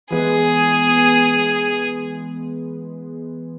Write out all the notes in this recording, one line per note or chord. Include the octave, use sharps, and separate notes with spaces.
E3 G#3 B3 G#4